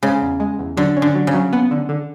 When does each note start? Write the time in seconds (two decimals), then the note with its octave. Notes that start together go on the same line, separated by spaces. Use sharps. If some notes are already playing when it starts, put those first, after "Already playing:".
0.03 C#3 G#3
0.21 E2
0.40 G#3
0.59 E2
0.77 D3 F#3
0.96 C#4
1.02 D3
1.14 F#3
1.27 C#3
1.33 F#3
1.53 B3
1.71 D3
1.89 D3